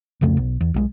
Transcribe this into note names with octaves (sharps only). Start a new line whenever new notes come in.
C2 F2 C#3 A3
B1
E2
B1 E3 G#3